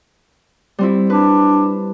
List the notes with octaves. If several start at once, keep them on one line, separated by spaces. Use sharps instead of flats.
G3 C4 E4
D4 B4